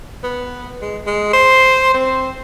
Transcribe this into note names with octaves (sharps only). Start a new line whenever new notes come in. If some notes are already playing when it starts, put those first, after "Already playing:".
B3
G#3
G#3
C5
C4